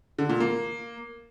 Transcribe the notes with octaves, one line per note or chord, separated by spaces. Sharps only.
D3
A#2
A#3